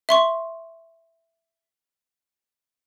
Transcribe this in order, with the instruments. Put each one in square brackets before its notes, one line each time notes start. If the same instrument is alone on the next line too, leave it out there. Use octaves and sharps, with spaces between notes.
[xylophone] E5 C6 C#6